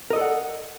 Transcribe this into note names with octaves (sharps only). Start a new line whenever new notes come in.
A4 A#4 D5 D#5 F#5